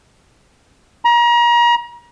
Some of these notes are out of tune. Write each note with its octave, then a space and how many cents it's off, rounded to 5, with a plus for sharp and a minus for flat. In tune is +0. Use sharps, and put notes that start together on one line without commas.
A#5 +35